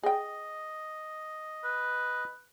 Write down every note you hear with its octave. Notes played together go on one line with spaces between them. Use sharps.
G#4 D#5 G5
B4